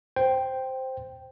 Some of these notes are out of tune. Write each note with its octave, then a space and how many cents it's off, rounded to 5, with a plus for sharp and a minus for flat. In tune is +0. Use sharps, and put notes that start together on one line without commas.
C5 +0 G5 +0